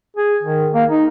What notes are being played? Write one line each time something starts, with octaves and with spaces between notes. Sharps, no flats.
G#4
D#3
A#3
D#4